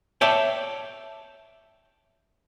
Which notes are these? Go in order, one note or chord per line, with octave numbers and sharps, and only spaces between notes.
C#5 D5 E5 G5 A5